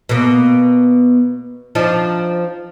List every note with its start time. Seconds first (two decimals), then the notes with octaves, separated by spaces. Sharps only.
0.09 B2 A#3
1.75 F3 D4 D#4